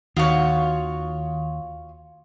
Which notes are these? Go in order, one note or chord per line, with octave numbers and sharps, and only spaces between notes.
D#2 D#3 F4 F#4 C#5